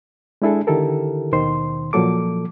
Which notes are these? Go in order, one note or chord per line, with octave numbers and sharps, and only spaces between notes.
G#3 D4 E4 G#4 A4
D3 D#3 E4 G4 A4 A#4
D#2 B2 D#3 C5 C6
A#2 F3 F#3 A4 D6